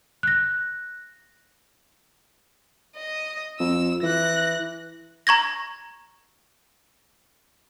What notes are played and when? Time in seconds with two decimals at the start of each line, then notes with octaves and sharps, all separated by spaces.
0.23 F#6 A#6
2.96 D#5
3.60 F2 E6
4.03 E3 F#6 A#6
5.27 A#5 C#6 G#6 A#6